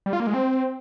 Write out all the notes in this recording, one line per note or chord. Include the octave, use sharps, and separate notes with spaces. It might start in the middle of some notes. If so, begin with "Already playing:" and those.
G3
F4
A#3
G#3
C4